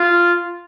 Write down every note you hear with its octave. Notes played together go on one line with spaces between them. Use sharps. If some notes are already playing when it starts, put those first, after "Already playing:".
Already playing: F4